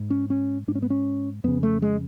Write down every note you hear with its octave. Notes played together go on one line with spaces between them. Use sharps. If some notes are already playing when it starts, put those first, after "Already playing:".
Already playing: G#2
C#4
C#4
G#2 D4
C#4
B3
C#4
F2 C#3 B3
A3
G#3